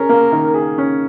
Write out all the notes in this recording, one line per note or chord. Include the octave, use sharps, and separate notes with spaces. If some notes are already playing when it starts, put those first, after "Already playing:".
Already playing: C#4 G#4 A#4
A#3
D#3
G#4
C#4